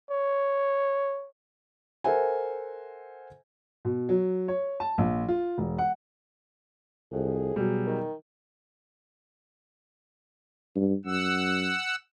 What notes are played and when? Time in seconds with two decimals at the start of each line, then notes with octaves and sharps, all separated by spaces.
0.11 C#5
2.04 A4 A#4 C5 E5 F#5 G#5
3.85 B2
4.09 F#3
4.48 C#5
4.80 A5
4.98 A#1
5.29 F4
5.58 E1
5.78 F#5
7.12 C2 F2 G#4
7.56 B2 F#3 G3
7.87 D#3
10.76 G2
11.06 F#2 F#5 E6